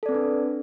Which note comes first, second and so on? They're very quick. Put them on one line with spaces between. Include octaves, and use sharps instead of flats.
A4 D5 C4 B4 D4